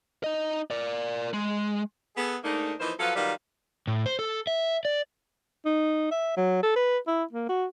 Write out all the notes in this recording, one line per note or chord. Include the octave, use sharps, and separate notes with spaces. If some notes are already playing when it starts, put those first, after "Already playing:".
D#4 D#5
A#4 D5
G#3
B3 G#4 A4
G#2 A3 A#3 D4 D#4
E3 F3 A#3 D#4 C5
F3 F#3 A4 B4 F5
D#3 F#3 G3 F4 B4 F5
A2
C5
A4
E5
D5
D#4
E5
F#3
A4
B4
E4
A#3
F#4